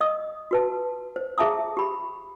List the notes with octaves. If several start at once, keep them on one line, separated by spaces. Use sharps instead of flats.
D#5 D#6
F#4 B4 A5
C5
G#4 E5 A5 A#5 D#6
G4 B5